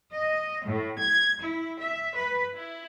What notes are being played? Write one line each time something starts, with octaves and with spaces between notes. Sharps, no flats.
D#5
A2
G#6
E4
E5
B4
E4